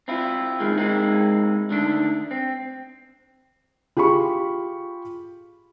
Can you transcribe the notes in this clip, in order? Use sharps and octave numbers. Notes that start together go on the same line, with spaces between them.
C4 E4 F4
B1 E2 A#2 D#3 G#3
G#3 A#3 C4 D#4 E4
D3 D#3 A3 D4
C4
F4 G4 G#4 B5 C#6